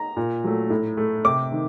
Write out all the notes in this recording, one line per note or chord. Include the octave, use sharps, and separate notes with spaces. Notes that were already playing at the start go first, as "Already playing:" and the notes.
Already playing: A#5
A#2
F#3 A3
A2
A3
C3 D6
D#3